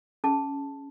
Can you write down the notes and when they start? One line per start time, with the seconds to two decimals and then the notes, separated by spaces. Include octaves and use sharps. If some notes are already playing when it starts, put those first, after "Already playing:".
0.24 C#4 G#4 A5